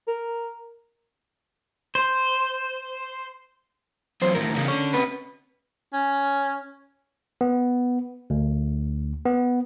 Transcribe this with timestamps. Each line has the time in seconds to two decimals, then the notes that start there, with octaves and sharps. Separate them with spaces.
0.08 A#4
1.95 C5
4.22 E2 F#3 C5
4.35 D#2 A2 A#4
4.55 E2 C#3
4.68 D3 C#4
4.93 C3 B4
5.93 C#4
7.41 B3
8.30 D2
9.26 B3